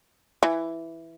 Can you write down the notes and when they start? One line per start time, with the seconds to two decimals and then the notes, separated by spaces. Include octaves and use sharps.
0.43 E3